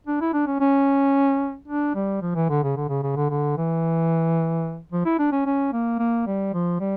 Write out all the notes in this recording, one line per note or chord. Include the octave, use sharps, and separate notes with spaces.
D4
E4
D4
C#4
C#4
D4
G3
F3
E3
D3
C#3
D3
C#3
C#3
D3
D3
E3
F3
E4
D4
C#4
C#4
A#3
A#3
G3
F3
G3